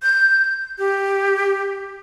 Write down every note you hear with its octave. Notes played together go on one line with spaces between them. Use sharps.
G6
G4